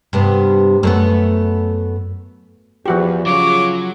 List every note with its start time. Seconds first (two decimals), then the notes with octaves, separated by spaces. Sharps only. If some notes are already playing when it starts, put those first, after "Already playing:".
0.13 G2 C3 B3
0.83 F#2 A3 B3
2.86 E2 F3 F#4 G4
3.26 C#3 F#3 F4 C#5 D6